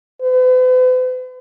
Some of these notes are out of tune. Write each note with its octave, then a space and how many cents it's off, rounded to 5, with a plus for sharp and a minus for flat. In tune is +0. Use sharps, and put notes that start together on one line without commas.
B4 +45